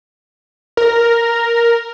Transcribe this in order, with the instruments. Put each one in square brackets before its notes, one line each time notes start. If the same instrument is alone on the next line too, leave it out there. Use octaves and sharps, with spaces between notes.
[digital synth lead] A#4